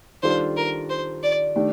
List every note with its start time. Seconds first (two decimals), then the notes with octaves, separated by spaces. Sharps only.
0.23 D#3 G3 D4 F4 A4 C5
0.56 A#4
0.89 C5
1.23 D5
1.56 D#3 A3 D4 G4